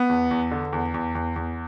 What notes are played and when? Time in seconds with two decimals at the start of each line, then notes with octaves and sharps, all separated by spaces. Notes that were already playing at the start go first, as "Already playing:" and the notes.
Already playing: B3
0.09 E2
0.31 E2
0.51 D3
0.73 E2
0.94 E2
1.15 E2
1.36 E2